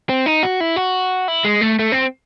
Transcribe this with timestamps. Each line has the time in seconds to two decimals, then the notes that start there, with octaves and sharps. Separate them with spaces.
0.09 C4
0.26 D#4
0.43 F#4
0.60 E4
0.76 F#4
1.28 E4
1.45 G#3
1.61 A3
1.79 A3
1.92 C4